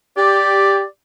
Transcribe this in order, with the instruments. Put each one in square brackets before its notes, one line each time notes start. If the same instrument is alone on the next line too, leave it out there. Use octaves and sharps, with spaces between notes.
[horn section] G4 [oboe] D5